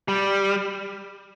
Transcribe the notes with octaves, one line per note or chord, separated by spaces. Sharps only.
G3